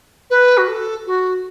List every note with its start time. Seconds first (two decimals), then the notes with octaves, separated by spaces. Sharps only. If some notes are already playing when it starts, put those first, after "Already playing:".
0.30 B4
0.57 F#4
0.67 A4
1.06 F#4